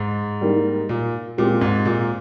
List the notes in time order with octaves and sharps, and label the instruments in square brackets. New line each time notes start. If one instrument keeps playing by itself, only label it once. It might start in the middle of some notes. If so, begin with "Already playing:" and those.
Already playing: [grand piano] G#2
[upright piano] G3 A#3 D#4 A#4
[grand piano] A#2
[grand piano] A#2 [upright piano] G#3 C4 G4 A#4
[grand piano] G#2
A#2